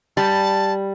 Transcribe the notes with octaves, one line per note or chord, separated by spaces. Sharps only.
G3 A5